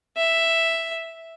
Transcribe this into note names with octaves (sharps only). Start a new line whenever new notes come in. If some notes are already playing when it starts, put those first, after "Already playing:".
E5